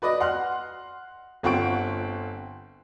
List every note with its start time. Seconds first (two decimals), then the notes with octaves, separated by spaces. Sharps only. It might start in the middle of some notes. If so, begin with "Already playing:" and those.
0.02 F#4 B4 D5 D#5
0.20 F#5 C6 F6 F#6
1.43 G1 C4 F4 F#5 C#6 D7